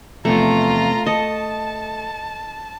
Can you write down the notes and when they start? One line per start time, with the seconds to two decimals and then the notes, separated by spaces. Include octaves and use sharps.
0.25 E2 C3 F3 A3 F4 A#5
1.07 A4 D#5 A5